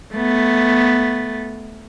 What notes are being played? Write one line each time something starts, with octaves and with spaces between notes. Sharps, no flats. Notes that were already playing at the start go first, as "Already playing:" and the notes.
A3 B3